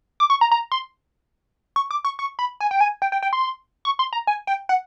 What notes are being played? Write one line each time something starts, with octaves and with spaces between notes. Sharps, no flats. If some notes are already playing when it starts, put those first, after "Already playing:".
D6
C#6
A#5
A#5
C6
C#6
D6
C#6
C#6
B5
G#5
G5
G#5
G5
G5
G5
C6
C#6
C6
A#5
G#5
G5
F#5